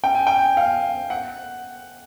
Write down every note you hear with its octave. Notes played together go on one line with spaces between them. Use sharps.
G5
G#5
G5
F5
F#5